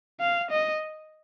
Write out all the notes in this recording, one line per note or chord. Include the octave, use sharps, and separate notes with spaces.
F5
D#5